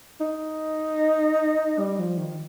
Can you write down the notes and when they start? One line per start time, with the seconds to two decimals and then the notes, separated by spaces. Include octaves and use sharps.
0.21 D#4
1.79 G3
1.99 F3
2.18 D#3